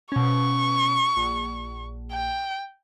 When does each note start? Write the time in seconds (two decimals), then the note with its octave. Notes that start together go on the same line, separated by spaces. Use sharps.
0.12 B2 C#4 C#6
1.16 A#1
2.12 G5